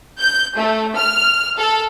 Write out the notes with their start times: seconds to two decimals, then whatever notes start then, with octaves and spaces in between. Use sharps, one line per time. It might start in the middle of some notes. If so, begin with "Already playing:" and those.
0.19 G6
0.57 A3
0.96 F6
1.58 A4